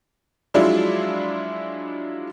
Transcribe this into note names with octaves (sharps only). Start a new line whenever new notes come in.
F3 F#3 G#3 D4 E4 F4